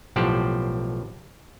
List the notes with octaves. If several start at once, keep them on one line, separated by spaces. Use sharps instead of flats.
B1 A2 F3 G4 C5 F#5